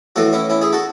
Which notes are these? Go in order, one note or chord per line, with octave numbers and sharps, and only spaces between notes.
A2 E3 F#4 A4
C#4 E4
C#4 E4
E4 G#4
F#4 A4